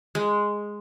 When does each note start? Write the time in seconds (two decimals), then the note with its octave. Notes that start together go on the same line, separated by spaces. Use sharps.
0.15 G#3